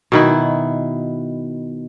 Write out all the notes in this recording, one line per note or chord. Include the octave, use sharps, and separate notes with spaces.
B2 D#3 E4